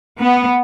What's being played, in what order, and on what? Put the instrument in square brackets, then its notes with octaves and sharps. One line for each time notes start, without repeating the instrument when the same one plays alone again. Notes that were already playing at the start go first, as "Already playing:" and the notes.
[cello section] B3